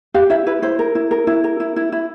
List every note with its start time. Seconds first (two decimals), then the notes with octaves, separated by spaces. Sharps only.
0.14 G4 F5
0.30 E4 E5
0.46 E4 B4
0.62 E4 C5
0.79 A#4
0.95 E4
1.11 A#4
1.27 E4
1.44 A#4
1.60 E4
1.76 E4
1.92 E4